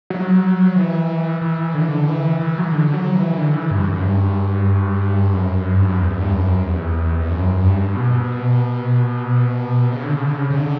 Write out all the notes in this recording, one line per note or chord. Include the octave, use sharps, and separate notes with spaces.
F#3
E3
E3
D3
E3
D3
E3
E3
F#3
E3
D3
F#3
E3
D3
E3
G2
F#2
G2
F#2
G2
F#2
E2
G2
F#2
E2
E2
F#2
G2
B2
C#3
D3
C#3
D3
C#3
C#3
D3